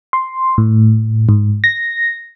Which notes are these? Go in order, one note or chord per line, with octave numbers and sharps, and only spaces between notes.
C6
A2
G#2
A#6